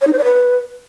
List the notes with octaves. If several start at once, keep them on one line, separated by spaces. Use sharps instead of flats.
C#5
D#4
C5
D5
B4